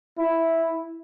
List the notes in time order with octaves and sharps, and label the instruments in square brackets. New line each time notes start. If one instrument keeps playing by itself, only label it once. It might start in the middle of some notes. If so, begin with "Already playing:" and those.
[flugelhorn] E4